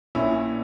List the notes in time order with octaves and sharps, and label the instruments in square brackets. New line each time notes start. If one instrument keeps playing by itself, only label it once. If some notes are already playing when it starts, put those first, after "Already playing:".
[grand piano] A#1 A#2 C#4 E4